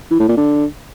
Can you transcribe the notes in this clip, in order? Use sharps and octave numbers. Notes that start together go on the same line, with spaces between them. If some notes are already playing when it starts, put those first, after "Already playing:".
E3
A2
A#2
D3